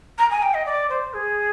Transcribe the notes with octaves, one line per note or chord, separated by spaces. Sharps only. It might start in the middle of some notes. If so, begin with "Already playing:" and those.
A#5
G#5
G5
D#5
D5
C5
G#4